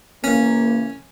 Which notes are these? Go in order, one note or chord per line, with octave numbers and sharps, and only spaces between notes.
C#3 E3 A#3 C#4